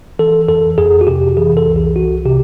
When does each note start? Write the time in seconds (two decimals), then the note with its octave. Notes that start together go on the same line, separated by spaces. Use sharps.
0.19 E3 A4
0.48 F2 A4
0.77 F2 G#4
1.01 F#4
1.07 C3 G4
1.37 E3 G#4
1.57 A4
1.67 C2
1.76 G#4
1.96 C2 F#4
2.25 C3 G4